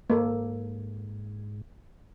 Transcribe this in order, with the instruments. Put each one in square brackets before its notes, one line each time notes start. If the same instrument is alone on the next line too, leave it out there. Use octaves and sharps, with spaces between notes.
[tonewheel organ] G#2 [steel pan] A#3 A4 C5